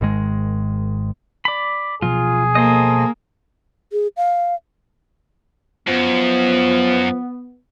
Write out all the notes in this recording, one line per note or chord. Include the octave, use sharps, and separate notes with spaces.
G#1 G#2 D#3 G#3
D5 B5
B2 F3 F#3 F4 G#4
A#3 A4 C5 D#5
G#4
F5
F#2 F3 B3